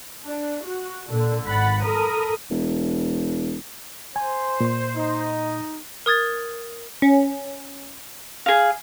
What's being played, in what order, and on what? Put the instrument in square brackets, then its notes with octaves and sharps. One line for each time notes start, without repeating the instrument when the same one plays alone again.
[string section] D4
F#4
A#2 D3
G#1 F#5 B5 A6
A4 A#4 B5 D#6
[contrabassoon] E1
[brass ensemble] C5 [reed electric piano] G#5
[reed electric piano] A#2 C6
[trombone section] D#4
[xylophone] A#4 D#6 G#6 A6
[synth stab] C#4
[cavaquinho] G#4 F5